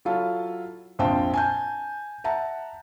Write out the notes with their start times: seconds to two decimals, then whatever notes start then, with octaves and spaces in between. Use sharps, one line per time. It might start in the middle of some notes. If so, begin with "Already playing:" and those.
0.05 F#3 E4 F4 A4 F5
0.99 A#1 F2 C5 F5 G5 A5
1.34 G#5 A5 G6
2.24 E5 F#5 A5 A#5